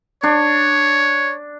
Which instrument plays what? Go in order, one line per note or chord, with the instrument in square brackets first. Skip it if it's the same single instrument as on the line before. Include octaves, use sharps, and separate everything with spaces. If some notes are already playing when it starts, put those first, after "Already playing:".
[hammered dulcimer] D4 [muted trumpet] C#5